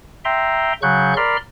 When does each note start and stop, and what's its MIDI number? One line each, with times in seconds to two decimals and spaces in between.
0.25 0.73 76
0.25 0.73 79
0.25 0.73 82
0.25 0.73 84
0.82 1.14 49
0.82 1.14 54
0.82 1.14 85
0.82 1.14 90
0.82 1.14 91
1.17 1.37 70
1.17 1.37 74
1.17 1.37 83
1.17 1.37 84
1.17 1.37 89